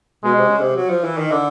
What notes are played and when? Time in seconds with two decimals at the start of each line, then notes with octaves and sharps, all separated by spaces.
0.24 B2 G#3
0.36 C3
0.47 C#3
0.60 C3
0.76 F#3
0.89 F3
1.04 E3
1.18 D#3
1.32 D3